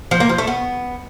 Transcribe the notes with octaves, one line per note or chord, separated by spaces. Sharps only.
F3
A#3
F3
A3
B3